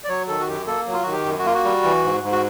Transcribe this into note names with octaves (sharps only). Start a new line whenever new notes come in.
D5
F#3 C#5
D#3 A4
F#4
F#2 G4
A#3 A4
F#3
F4
D#3 F#4
G4
F#2
F#4
A#3 F4
F#4
G3
E3
G#2
G#2
F#4